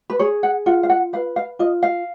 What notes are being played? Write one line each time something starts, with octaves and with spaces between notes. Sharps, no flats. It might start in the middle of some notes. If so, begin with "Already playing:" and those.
B4
G#4 C#5
F#5
F4 F#5
F5
F#5
B4 F5
F5
F4 D#5
F5